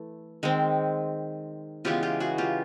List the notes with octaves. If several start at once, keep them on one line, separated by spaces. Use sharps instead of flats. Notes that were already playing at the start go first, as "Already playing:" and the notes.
Already playing: E3 A3
D#3 G#3 C4
C#3 E3 G#3 B3 F4 G4
F4 G4
F#4 G#4
F4 G4